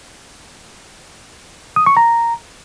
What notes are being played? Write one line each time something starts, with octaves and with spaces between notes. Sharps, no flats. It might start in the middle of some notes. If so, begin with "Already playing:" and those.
D#6
C#6
A#5